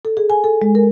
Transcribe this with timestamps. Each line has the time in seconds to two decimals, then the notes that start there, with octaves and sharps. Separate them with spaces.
0.05 A4
0.17 G#4
0.30 G#5
0.44 A4
0.62 G#3
0.75 A#4